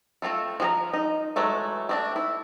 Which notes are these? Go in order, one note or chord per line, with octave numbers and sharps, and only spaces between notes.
A3 C4 F4 A4
F3 G#4 A#5
D#4
E3 F#3 G#3 A3
A3 C4 D4
E4